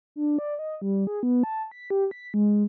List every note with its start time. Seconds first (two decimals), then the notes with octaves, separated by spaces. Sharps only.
0.16 D4
0.38 D5
0.59 D#5
0.81 G3
1.07 G#4
1.23 B3
1.44 A5
1.71 B6
1.90 G4
2.11 B6
2.34 G#3